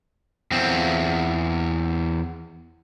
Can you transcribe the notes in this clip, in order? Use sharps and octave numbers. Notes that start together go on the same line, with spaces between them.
E2 C4